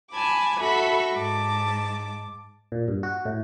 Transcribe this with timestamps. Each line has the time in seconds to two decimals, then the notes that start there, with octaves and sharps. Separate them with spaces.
0.12 G#5 A5 B5 D6
0.60 F#4 A4 E5 B5 C#6
1.14 G#2 A5 D6
2.72 A#2
2.88 G2
3.03 F#4
3.25 A2